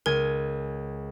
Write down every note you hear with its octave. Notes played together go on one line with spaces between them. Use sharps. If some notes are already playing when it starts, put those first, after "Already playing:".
C#2 A#4 G#5 G#6